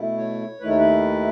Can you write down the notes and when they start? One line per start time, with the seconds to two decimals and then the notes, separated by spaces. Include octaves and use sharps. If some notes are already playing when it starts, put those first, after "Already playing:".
Already playing: B2 A3 E4
0.17 C#5
0.60 D#2 D#3 A3 E4 B4
0.68 C#5
0.77 B4